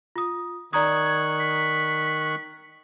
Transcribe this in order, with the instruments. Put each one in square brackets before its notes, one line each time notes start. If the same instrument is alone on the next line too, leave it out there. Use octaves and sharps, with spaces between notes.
[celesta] F4 D#6
[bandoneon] D#3 C#6 F#6 [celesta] D5 A#5 D#6 [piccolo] G#6
[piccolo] B6